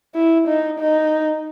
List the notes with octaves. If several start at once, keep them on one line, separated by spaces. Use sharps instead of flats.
E4
D#4
D#4